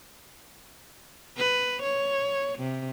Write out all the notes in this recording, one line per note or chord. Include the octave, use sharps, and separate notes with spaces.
B4
C#5
C3